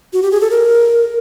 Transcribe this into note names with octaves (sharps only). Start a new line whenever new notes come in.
F#4
G4
G#4
A4
A#4